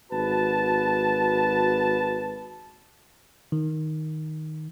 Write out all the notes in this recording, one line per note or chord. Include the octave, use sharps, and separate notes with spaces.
G#1 F#4 B4 A5
D#3